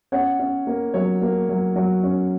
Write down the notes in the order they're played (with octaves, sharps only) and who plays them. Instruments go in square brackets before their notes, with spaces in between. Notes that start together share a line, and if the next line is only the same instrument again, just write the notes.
[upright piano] C#4 C#5 F#5
C#4
A#3
F#3 C#5
A#3
F#3
F#3
C#4